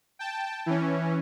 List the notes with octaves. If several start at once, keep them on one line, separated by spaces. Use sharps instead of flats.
G5 A5
E3 C#4